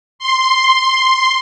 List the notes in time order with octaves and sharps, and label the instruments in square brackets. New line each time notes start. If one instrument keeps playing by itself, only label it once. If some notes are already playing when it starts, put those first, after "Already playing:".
[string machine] C6